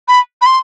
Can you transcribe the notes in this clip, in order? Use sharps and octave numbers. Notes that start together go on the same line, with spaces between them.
B5
B5
C6